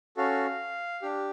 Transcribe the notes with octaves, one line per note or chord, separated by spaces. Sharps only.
C#4 F#4 A4 F5
D4 G4